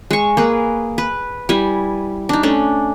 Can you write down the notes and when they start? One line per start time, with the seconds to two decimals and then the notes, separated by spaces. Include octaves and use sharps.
0.10 G#3 C#6
0.37 A#3 G#4 B4
0.98 B4
1.49 G3 E4 G#5
2.29 D4 D#4
2.43 A3 C#4 D4